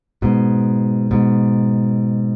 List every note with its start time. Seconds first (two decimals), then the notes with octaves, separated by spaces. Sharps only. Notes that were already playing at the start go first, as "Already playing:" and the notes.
0.22 G#2 B2
1.11 G#2 B2